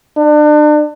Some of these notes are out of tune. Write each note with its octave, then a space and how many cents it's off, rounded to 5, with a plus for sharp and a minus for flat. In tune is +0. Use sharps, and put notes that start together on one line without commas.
D4 +35